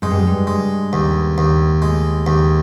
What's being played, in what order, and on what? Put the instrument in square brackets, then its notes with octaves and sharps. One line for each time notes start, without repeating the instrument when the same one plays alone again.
[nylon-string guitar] G#2 [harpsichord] G#3
[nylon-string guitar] G2
F#2
G2
[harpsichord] G#3
D#2
D#2
[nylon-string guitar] A2 [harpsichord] G#3
[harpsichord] D#2